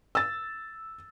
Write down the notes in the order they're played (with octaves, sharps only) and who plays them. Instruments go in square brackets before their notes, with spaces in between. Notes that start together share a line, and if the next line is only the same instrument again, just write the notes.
[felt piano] E6 A6